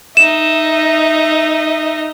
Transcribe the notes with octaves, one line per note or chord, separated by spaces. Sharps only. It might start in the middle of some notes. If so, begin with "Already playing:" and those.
D#4 D#5 E5 E7